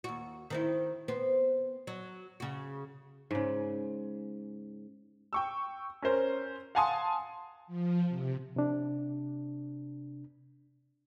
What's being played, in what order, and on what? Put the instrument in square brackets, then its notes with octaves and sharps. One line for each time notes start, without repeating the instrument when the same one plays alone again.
[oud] D#2 F#4
D#3 C4 E4
B3 C4
F#3
C#3 F#4
[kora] G#2 C#3
[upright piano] G5 C#6 E6
C#4 A#4 C5
F5 F#5 G#5 A5 C6 D#6
[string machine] F3
C3
[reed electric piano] C3 D4